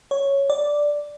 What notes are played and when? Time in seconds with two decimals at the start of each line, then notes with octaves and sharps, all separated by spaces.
0.11 C#5
0.50 D5